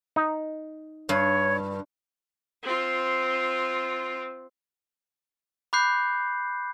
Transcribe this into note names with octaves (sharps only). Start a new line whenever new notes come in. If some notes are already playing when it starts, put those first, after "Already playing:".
D#4
G2 C#5
C4 F4
B5 D6 F#6 G6 C7